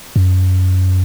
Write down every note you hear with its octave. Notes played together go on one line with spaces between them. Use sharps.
F#2